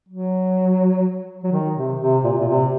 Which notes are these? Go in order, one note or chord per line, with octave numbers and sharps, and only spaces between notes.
F#3
F#3
D#3
C3
C3
A#2
A#2
C3